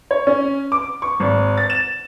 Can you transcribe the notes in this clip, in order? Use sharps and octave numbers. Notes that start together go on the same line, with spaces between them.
C#5
C#4
D6
C#6
G#1
A6
E7